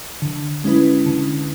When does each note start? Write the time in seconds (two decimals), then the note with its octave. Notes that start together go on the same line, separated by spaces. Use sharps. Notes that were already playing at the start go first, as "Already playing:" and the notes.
0.22 D3
0.64 G#3 C#4 E4 B4
1.06 D3